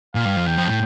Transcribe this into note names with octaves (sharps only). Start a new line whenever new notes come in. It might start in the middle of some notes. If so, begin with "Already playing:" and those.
A#2 F5
G2
F2
E2 G5
F2
A2